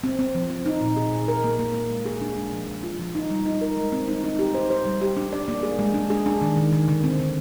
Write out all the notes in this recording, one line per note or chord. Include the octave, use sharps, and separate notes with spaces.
C4
C4
F3
C4
D#4
A#2
G#4
A#2
A#4
A#3
A#3
A#3
G#3
G#4
D4
G#3
F3
F3
F4
F3
D#4
G3
D#4
A#4
G#3
C4
D#4
D#4
G4
C5
C5
G3
G4
D4
D5
A#3
G#4
G#3
D4
G#4
D4
D#3
D#3
D#3
D3
C4
D3